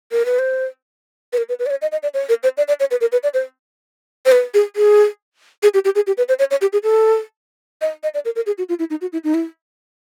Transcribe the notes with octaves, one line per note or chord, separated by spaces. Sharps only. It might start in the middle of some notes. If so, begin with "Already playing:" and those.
A#4
B4
C5
B4
A#4
B4
B4
D5
C#5
D#5
D#5
D5
C#5
A#4
C5
D5
D5
C#5
B4
A#4
B4
D5
C5
C5
B4
G#4
G#4
G#4
G4
G4
G#4
G4
B4
C5
C#5
C#5
G4
G#4
A4
D#5
D#5
D5
A#4
A#4
G#4
F#4
F4
E4
D#4
F#4
E4
D#4
E4